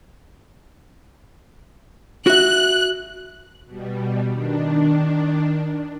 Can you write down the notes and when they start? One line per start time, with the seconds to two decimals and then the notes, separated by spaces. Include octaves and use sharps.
2.27 F#4 E5 F#6
3.66 B2 G3
4.28 D#3 D4